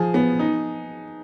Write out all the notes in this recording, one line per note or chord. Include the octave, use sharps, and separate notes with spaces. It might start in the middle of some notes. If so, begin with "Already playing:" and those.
Already playing: F3 G#4
B3
D#4